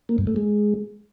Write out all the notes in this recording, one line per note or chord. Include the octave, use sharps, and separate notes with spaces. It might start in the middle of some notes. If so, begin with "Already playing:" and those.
A#3
G2
A3
G#3